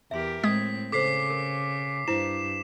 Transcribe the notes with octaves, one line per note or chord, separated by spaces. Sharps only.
E2 G4 A#4 E5 C6
A2 G#3 C4 D#6 G#6 B6
C#3 A4 C5 D6 B6 C7
A#4
G2 E4 C5 E7